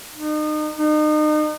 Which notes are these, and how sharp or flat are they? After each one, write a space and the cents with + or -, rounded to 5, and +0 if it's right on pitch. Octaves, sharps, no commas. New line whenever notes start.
D#4 -35
D#4 -35